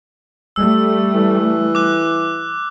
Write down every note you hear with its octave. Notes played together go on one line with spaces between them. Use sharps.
G3 A3 E6
E3
D6 F#6